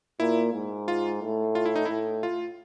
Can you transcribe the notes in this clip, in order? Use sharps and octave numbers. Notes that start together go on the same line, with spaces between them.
A#2 E4
G#2
F4
A2
F4
E4
D#4
A2 E4
F4